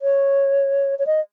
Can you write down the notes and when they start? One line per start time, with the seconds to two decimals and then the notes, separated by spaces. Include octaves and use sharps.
0.01 C#5
0.98 C#5
1.06 D#5